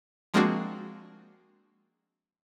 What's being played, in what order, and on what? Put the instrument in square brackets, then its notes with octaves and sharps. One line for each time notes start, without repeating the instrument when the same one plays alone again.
[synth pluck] F3 G#3 A#3 C4 D4 F#4